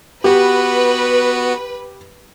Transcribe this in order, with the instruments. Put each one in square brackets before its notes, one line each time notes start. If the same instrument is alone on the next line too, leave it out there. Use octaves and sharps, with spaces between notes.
[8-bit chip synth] B3 F#4 [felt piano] G4 [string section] B4